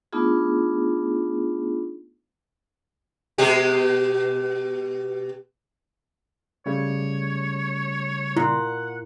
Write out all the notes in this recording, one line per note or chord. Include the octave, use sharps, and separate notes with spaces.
A3 B3 D4 D#4 F4 G#4
B2 G#3 G4
C#3 G3 A3 C#5
A#2 E4 F#5